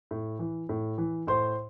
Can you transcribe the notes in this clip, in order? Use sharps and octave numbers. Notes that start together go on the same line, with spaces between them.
A2
E3
A2
E3
A2 C5 C6